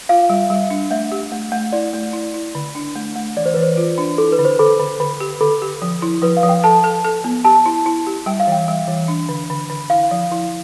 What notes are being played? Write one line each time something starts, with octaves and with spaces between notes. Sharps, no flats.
F4 F5
G3
G3
D4
A3 E5
G4
A3
A3
E4 D5
A3
E4
E4
D3
D4
A3
A3
E3 D5
C5
E3 B4
C5
F4
D4
E4 A4
B4
D3
C5
D3 A4
D3
D3
G4
D3 A4
G4
F3
E4
F3 B4
F5
F3
G5
A4 A5
A4
A4
B3
G4 A5
E4
E4
G4
G3 G5
F5
E3 G5
G3
E3
D4
D3
D3
D3
E4 F5
F3
E4